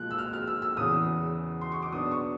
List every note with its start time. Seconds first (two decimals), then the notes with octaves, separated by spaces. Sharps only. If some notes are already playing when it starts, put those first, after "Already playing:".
Already playing: A#2 F3 G#3 F#6
0.11 E6
0.18 F6
0.33 F6
0.47 E6
0.62 E6
0.77 E2 C#3 E3 D#6
1.61 C6
1.72 C#6
1.82 D6
1.92 B2 F#3 B3 D4 D#6
2.11 C#6